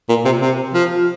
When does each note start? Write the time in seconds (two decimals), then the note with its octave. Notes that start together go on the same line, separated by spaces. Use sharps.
0.09 A#2
0.25 C3
0.41 C3
0.74 F3